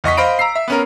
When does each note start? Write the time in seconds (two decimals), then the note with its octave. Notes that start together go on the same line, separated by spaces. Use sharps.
0.04 E2 D#5 C#6 B6
0.17 C5 D#5 F5 B5 D7
0.39 A#5 E6 C7
0.55 E5
0.68 B3 C#4 A#4